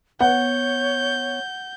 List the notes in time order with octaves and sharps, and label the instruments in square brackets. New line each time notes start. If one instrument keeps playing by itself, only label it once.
[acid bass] B3 [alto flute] C#5 [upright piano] F#5 [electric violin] G6